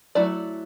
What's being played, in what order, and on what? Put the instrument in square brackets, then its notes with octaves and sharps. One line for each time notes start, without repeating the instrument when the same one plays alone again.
[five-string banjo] F#3 A3 E4 D5